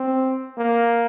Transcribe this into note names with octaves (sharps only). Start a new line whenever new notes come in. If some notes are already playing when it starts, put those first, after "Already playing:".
Already playing: C4
A#3